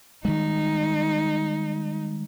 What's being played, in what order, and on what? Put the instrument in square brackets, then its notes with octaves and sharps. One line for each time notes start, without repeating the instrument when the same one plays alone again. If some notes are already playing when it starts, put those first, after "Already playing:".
[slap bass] D#3 G3 G#3 [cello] D#4